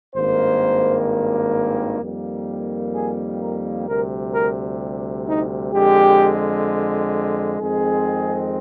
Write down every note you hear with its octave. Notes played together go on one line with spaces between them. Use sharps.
G#1 G2 D#3 A#3 C5
F2 D#3 G3 A#3
G#4
A#4
D2 C3 G3 A#4
A#4
D#4
F2 D3 G#3 G4
F2 D#3 G#3 C4 G#4